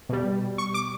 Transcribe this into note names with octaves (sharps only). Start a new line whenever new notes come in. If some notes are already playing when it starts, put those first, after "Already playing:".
B2 G3
C#6
D6